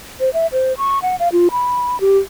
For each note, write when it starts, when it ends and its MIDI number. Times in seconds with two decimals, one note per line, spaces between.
0.20 0.32 72
0.33 0.47 76
0.52 0.76 72
0.78 0.99 85
1.02 1.16 78
1.19 1.29 77
1.32 1.48 65
1.51 2.00 83
2.01 2.18 67